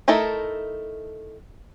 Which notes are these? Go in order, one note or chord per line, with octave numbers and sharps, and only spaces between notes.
A3 D#4 E4 A4 A#4